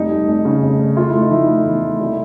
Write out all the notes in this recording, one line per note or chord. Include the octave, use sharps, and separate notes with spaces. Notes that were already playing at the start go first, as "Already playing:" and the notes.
Already playing: F1 G3 D#4
F1
F1
C#3
F1
F1
A3 F4
A3 E4
D#4
F3 E4
A3
E2
A3
C2